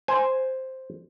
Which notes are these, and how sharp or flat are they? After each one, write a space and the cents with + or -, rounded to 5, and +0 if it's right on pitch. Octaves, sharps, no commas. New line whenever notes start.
C5 +0 G#5 +0